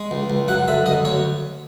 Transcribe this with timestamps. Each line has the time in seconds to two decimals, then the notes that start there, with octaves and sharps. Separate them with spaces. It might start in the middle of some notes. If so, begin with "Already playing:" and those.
Already playing: G#3
0.11 C#2
0.30 C#2
0.48 F#2 F#5
0.68 D3 E5
0.86 F#2 D#5
1.05 D2 C#5